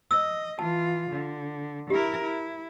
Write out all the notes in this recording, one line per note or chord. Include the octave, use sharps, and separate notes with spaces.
D#5 E6
E3 F4 A5
D3
E4 G4 A#4
E4